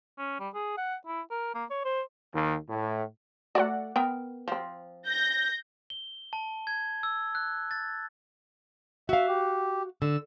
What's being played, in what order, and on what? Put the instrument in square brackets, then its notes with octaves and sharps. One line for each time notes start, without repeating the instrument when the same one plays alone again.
[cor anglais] C#4
G3
G#4
F#5
E4
A#4
A#3
C#5
C5
[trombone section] D#2
A2
[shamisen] A3 F#4 [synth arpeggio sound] D5 F#5
[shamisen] B3 A#4 G5
F3 C4
[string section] G6 A#6
[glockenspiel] G7
A5
G#6
E6
F#6
A6
[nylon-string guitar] F#4 F5 [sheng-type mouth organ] E5
[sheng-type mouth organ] G4
[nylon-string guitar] D3 [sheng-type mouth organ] E6